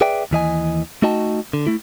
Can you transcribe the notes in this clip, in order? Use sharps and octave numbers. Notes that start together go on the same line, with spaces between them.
G#4 B4 D5 E5 G5
D#2 E3 D#5 G#5
A3 D#4 F#4 D#5 G5 A5
D3
A3 E4